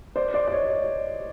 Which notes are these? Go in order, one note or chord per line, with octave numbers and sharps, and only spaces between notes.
C5 D5
C5 D5
D5
C#5 D#5